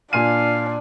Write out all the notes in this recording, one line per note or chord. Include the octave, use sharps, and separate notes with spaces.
A#2 D4 F5 G#5 D#7